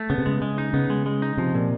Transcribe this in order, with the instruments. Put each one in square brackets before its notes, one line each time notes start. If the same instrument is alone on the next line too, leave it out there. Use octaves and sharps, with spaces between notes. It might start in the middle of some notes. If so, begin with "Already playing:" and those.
Already playing: [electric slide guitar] A3
[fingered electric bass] C#3 [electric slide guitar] B3
[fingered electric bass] C3
[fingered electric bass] C#3 [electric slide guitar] G#3
[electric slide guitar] G#3
D#4
[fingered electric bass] C#3 [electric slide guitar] B3
[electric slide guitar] G#3
G#3
D#4
[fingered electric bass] C3 [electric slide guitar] F3
[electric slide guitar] A#2